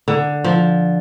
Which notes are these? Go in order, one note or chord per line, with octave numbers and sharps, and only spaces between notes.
D3
F3